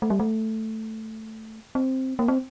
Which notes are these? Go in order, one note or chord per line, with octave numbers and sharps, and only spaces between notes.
A3
G3
A3
C4
A#3
C4